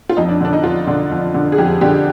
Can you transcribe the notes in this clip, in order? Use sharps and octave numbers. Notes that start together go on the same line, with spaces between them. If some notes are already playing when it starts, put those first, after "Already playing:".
F4
F2 D#4
D4
D3 D4
D#4
F2 F4
D3
F2
D3
G#4
F2 G4
D3 G4